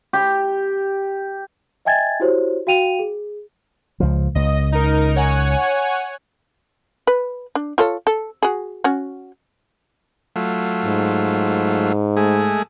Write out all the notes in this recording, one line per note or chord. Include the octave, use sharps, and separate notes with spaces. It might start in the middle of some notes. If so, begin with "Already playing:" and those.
G4
D#5 E5 G5 G#5 G#6 A6
E4 F#4 G4 C5 C#5
F#4 F5 G5 D#7 F7
G#4
C#2 F3
C#2 D#5
D#4 A#4
C#5 F#5 G#5
B4
D4
F4 A4 C#5
A4
F#4 G#4
C#4 F#4
F#3 A3 F4
G#2
G#3 A3 G#4